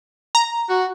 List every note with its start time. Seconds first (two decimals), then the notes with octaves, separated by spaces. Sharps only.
0.35 A#5
0.69 F#4